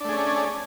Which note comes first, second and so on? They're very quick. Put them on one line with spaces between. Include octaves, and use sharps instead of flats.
D4 A3 G#4 C#4